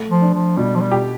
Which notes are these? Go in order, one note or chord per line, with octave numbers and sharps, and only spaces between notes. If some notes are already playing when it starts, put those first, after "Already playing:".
Already playing: A3
F3
D4
F3
B2 G3
F3
G3
G4